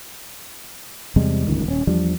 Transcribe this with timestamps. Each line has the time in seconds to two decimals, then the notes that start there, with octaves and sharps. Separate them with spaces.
1.16 E2 C3 G3 G#3
1.47 D1 G1 C#2 D#3
1.66 D#1 C4 C#4
1.87 E2 F3 G3 D4